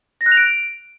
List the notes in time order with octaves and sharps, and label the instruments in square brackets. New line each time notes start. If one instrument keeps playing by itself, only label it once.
[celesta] A#6
F#6
F7
D7